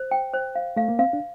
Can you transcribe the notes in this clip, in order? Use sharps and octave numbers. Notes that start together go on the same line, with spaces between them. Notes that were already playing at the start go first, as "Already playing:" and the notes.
Already playing: C5
G5
C5
F5
A3 F5
A#3
C4 F5
D4